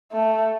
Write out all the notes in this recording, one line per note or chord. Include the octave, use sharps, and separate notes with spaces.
A3